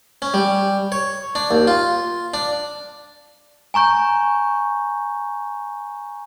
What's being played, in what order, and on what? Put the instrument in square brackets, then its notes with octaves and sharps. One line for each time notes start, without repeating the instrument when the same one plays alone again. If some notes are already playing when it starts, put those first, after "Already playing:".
[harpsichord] C#4
G3
C#5
D4
D#2
F4
D4
[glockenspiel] G#5 A#5 C#6 G6